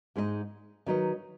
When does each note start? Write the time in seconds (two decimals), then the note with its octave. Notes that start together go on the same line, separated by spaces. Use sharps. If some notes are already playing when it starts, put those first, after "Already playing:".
0.16 G#2 G#3 D#4 G#4 D#5
0.86 D#3 F#3 D#4 B4 D#5